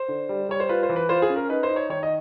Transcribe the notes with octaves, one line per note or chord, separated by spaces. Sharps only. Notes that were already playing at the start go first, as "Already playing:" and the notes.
Already playing: C5
D3
G3
G3 C#5
C5
F4 B4
C5
E3
B4
F4 C5
G#4
C#4
A#4
D#4 B4
C5
D#4
C#5
D#3 C#5
D#5